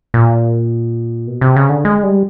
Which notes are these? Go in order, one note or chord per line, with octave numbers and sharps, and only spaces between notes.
A#2
B2
C3
C#3
D3
G#3
G3